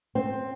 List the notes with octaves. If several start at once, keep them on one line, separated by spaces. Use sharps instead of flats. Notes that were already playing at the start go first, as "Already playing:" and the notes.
C4